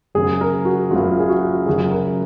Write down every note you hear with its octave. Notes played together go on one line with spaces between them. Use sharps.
F#1 F#2 C#3 F#3 G#4
A#4
F#4
F#1 F#2 C#3 F#3 F4
G#4
F#4
F#1 F#2 C#3 F#3 G#4
A#4